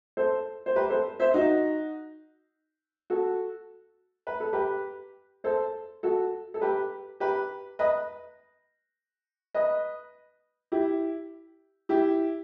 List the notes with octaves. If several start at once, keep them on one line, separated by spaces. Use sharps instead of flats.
A4 C5
C5
G4 B4
A4 C5
C5 E5
D#4 F#4
F#4 A4
B4
A4
G4 B4
A4 C5
F#4 A4
A4
G4 B4
G4 B4
B4 D#5
B4 D#5
E4 G4
E4 G4